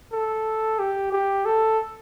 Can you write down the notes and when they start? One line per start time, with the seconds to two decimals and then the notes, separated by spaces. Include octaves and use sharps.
0.13 A4
0.79 G4
1.12 G4
1.46 A4